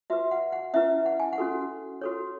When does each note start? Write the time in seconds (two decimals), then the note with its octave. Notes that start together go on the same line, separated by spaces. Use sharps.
0.10 F#4 B4 E5
0.31 F#5
0.52 F#5
0.74 C#4 E4 B4 E5
1.06 F#5
1.20 G#5
1.33 F#5
1.38 C#4 F#4 A4
2.01 F#4 A4 C#5